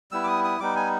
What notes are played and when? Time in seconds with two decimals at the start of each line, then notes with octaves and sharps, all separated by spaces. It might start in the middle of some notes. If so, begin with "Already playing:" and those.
0.12 G3 B3 E4 E6
0.23 D6
0.28 D#6
0.44 D#6
0.60 G3 B3 D#4 D6
0.76 G#5